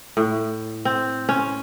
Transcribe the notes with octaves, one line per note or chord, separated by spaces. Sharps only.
A2
C4
C#4